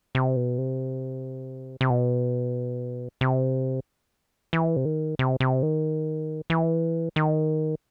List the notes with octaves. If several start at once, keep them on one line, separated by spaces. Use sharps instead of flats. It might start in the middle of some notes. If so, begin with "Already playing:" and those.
C3
B2
C3
C3
B2
C3
E3
C3
D#3
C3
C3
D#3
E3
D#3